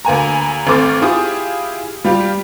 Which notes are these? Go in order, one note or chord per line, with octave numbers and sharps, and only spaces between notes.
D2 A#3 G#5 A#5
G#1 A3 C4 D6 F6 A6
E4 F4 G4 G#4 D#6
G3 F4 G4